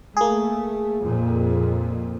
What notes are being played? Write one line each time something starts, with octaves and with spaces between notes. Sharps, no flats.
A3 A#3 G#4
F2 A#2